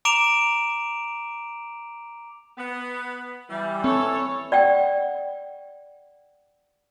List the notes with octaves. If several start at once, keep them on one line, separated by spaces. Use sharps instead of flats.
A#5 D6 D7 E7 F7
B3
E3 G3
C4 A4 C#5
D5 F#5 G5